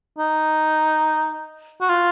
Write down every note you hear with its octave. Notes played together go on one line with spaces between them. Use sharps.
D#4
F#4
F4